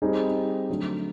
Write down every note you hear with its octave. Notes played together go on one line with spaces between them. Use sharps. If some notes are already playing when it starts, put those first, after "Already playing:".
G3 C4 D#4 G#4
D3 F#3 A3